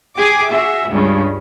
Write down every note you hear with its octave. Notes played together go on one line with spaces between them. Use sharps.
G4 G#4 G#5 D6
F#4 G#4 E5
C#2 G2 C#3